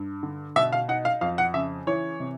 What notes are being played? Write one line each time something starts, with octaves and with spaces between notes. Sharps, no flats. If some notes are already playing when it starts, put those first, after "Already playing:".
Already playing: G2
D3
B2 E5
F5
D#4 F#5
F5
F2 F5
F#5
C#3 E5
E3 C#5
C3